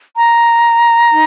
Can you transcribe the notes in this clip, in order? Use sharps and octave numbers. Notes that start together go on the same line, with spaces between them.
A#5
D#4